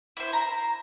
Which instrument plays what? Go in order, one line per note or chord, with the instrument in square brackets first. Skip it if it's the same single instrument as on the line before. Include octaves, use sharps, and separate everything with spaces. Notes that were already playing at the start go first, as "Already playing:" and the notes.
[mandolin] E4 C5
A#5